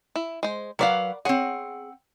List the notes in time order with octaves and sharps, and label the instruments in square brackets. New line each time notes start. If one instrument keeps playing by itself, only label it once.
[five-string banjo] E4
G#3 C5
[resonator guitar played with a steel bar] F#3 B4 F5 [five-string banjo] A#4 D5 F#5
[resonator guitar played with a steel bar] C4 F#5 [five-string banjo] G#4 C#5